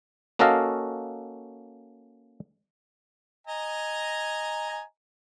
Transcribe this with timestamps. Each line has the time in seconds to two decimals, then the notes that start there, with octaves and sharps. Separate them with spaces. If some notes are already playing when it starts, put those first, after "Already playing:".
0.39 A#3 C#4 F#4 A4 D#5 F5
3.47 D#5 G#5 A#5